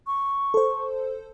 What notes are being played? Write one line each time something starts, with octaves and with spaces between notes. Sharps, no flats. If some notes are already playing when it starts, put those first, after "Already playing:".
C#6
A4 C5